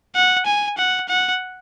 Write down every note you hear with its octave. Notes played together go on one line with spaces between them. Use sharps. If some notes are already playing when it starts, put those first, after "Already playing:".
F#5
G#5
F#5
F#5